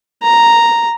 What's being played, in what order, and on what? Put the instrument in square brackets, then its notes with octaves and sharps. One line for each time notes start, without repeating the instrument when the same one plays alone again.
[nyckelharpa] A#5